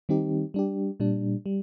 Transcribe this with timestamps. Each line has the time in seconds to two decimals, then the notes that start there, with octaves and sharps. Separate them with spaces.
0.09 D#3 G3 C4 D#4 G4
0.54 G3 D4 G4
1.00 A#2 G3 D4
1.46 G3